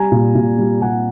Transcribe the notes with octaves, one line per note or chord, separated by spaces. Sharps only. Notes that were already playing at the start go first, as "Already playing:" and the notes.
Already playing: G3 G#5 A#5
A#2
A#2
G3
G3 F#5 G#5